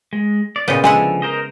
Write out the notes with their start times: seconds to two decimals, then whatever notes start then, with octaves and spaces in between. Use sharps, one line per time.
0.13 G#3
0.56 D5
0.68 A#2 C#3 B3 F4 D#5 G5
0.84 D3 F3 G#3 E4 F#5 G#5
1.22 A#4 C5 D#5